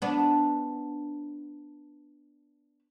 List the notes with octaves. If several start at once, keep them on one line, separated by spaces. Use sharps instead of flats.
B3 D4